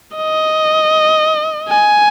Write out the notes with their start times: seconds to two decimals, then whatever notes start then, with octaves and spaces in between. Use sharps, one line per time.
0.16 D#5
1.69 G#5